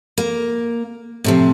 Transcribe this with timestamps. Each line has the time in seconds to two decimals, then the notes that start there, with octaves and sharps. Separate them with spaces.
0.18 A#3
1.24 A2 C3 F3